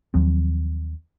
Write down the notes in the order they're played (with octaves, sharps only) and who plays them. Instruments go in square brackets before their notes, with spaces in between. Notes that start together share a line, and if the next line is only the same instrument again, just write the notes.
[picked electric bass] D#2 F3 F#3 C4